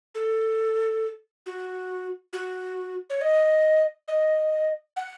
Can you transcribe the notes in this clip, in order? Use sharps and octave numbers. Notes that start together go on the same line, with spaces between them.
A4
F#4
F#4
C#5
D#5
D#5
F#5